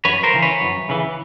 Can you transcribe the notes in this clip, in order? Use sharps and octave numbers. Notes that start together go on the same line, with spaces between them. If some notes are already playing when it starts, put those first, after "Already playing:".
F#2 B4 C#5
A#4 C5
C#3 E3
B4 C#5
F#2
C#3 E3